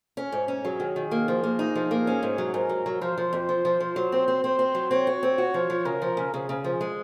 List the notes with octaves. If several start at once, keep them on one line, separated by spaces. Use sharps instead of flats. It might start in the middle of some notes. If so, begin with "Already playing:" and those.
C#4
G#2
C#4
F#3 G#4
D#3
D#3
A#3
F3
A#3
D#4
F3
A#3
C#4
G#2
F#3
G#2 A#4
F#3
F#3
F3 C5
F3
F2
F3
F3
F3
F#3
C4
C4
C4 C5
C4
F#3
C4 C#5
F#4
C4
F#4
F3
F3
C#3 A#4
F3
C#3
C#3 G#4
C#3
F3
G#3